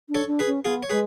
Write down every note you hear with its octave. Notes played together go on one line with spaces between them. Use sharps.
D4
A4 C#5
D4
G#4 B4
C#4
B3 F4 G#4
C#5
G#3 G#4 B4